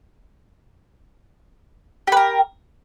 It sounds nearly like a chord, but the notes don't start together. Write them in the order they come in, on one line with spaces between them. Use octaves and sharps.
G4 B4 A#4